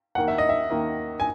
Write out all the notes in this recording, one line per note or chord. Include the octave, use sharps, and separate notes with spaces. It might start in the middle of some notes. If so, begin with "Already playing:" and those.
D#2 D#3 A#3 F#5
E5
D#5
E5
D#2 D#3 A#3
G#5